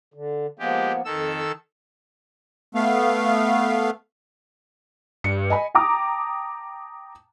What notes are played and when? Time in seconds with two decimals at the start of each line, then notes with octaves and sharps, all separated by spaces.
0.14 D3
0.59 F3 G#3 A#3 B3 G4
1.05 F2 D#3 A4 E6
2.75 A3 B3 F5
5.24 G2 C#7
5.50 D#5 G#5 B5
5.75 G5 A5 A#5 D6 D#6